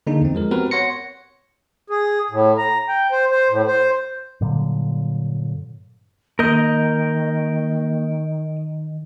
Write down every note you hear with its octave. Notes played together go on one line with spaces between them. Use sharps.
D3 A#3 D4 D#4 G#4
E2 C4
F3 G#3 A#4
B3 C4 F#4 G4 A#4 B4
C#5 F#5 C6 A#6 C#7
G#4
A2
A#5
G5
C5
C5
A2
C5
G2 A#2 D3 F#3
D#3 A#3 A#4 D#5 G6